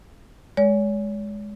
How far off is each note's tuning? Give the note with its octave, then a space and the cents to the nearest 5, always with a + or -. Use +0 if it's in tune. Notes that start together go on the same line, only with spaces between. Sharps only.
G#3 +0 C#5 +40